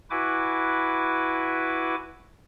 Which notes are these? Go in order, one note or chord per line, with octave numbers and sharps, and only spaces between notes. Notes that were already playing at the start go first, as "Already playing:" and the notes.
E4 F#4 B4 G#5 D6